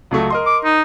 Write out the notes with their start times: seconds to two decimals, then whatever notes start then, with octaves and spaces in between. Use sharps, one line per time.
0.11 C#2 F#3 A3
0.30 A#4 D#5 C6
0.46 D6
0.64 D#4